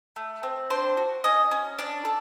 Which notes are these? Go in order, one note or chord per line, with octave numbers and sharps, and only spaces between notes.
A3
C4
D4 C5
F#4
C#4 D#5
C#4
D4 D5
A4